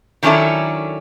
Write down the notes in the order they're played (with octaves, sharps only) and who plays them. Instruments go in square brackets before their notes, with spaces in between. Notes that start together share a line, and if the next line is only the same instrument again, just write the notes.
[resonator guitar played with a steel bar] D#3 F#3 C#4 D4 E4 A4